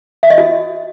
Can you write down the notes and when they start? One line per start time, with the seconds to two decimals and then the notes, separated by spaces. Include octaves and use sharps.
0.23 E5
0.30 D#5
0.38 F#4